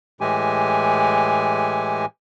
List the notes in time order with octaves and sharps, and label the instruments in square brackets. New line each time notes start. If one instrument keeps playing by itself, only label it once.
[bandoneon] A2 E3 G#3 G4 G#5